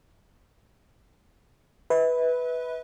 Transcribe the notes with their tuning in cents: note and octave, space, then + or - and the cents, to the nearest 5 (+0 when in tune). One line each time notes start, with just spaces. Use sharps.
B4 +0 E5 -40